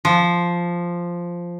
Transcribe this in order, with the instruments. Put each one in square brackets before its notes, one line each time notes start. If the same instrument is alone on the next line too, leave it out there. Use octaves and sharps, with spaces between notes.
[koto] F3